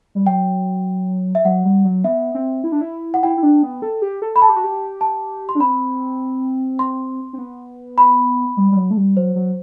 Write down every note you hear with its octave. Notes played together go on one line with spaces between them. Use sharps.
G3
F#3 G5
E5
F#3 F#5
G3
F#3
B3 E5
C4
E4
D4
E4
F#5
E4 G5
E4
D4
B3
A4
G4
A4
B5
A4 A5
G4
F#4
G4
A5
C6
D4
C4 B5
C6
C4
B3
B5
G3
G3
F#3
A3
G3
F#3 C5
F#3